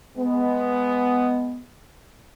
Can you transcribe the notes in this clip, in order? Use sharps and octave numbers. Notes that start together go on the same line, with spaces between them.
G#3 B3